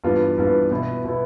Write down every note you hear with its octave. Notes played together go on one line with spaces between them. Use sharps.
G2 E3 B3 F4
G2 E3 B3 F4
B2 B3 E4
B2 B3 E4